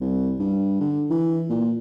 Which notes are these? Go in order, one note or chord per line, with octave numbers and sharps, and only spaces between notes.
C2
G2
D3
E3
A#2